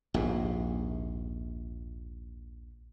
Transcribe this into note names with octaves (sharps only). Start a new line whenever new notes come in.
A#1 D#2 G#2